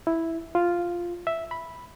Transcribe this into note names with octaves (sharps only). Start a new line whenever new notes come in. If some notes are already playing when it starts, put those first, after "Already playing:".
E4
F4
E5
B5